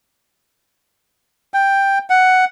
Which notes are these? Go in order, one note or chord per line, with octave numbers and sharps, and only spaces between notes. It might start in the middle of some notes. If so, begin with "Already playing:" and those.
G5
F#5